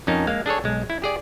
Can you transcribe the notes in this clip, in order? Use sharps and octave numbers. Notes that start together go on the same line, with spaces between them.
F2 C#4 D#4 A#4 A5
G#3 A#3 F5
D4 G#4 A4 C#5
B1 G#3
E4
G4 G#4 D5